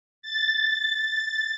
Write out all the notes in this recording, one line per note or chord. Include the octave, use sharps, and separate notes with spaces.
A6